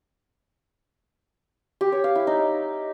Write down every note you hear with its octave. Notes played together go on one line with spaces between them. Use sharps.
G4
C#5
F5
E4
D#4